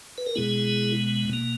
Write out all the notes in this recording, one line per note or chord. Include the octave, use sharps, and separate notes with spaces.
B4
A#4
B2 G#3 B3 E4 G#4
B2 A#3